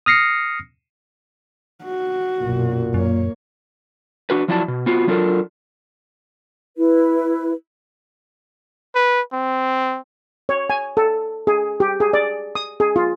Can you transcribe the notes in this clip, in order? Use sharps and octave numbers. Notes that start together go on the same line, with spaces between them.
D#6 F6 A#6 C7 C#7
F#4
B1 F#2 A#2
F#2 A#3 C#5
D4 F#4 B4
F3 F#3 E4 D5 F5 A5
B2
B3 F4 F#4 C5
F#3 D4 F4 A4 A#4
E4 B4
B4
C4
C#5
G#5
A4
G#4
G4
G#4
D5
D#6
G#4
F4